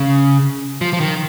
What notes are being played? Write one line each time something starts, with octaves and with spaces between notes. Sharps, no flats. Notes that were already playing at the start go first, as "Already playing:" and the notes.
Already playing: C#3
F3
F3
D#3